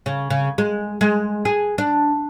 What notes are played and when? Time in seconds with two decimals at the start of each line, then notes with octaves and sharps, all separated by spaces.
0.06 C#3
0.30 C#3
0.58 G#3
1.01 G#3
1.45 G#4
1.78 D4